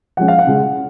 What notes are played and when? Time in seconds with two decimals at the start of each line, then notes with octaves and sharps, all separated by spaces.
0.17 F3 G#3 C#4 F#5
0.28 F5
0.39 F#5
0.47 C#3 G#3 C#4